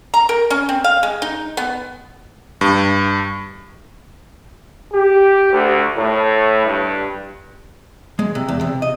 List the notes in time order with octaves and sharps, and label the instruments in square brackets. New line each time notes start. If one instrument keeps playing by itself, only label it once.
[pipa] A#5
A#4
C#4
C4
F5
G#3
D#4
B3
[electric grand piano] G2
[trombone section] G4
D2
A2
G2
[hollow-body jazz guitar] G#3
C3
E2
C3
D#5